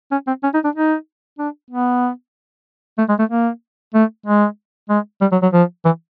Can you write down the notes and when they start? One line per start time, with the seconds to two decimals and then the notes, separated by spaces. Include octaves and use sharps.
0.12 C#4
0.27 C4
0.43 C#4
0.54 D#4
0.64 D4
0.75 D#4
1.39 D4
1.70 B3
2.98 A3
3.09 G#3
3.19 A3
3.30 A#3
3.94 A3
4.26 G#3
4.89 G#3
5.21 G3
5.32 F#3
5.43 F#3
5.53 F3
5.85 E3